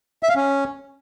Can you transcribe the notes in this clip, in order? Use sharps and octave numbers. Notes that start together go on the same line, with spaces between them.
E5
F5
C#4